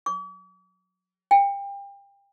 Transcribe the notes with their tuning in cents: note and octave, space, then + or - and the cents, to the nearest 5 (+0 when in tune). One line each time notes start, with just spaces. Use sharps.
D6 -45
G5 +30